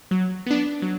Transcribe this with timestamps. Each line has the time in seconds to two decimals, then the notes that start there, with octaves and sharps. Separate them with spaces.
0.11 F#3
0.46 B3 D4
0.82 F#3